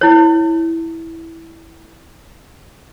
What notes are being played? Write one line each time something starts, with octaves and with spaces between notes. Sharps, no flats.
E4 C#5